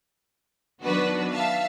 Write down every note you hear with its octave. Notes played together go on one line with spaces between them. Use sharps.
D#3 F#3 B3 D4 F#4 B4
E5 F5 A5